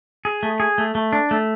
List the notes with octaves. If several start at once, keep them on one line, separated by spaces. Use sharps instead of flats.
G#4
A3
G#4
A3
A3
D4
A3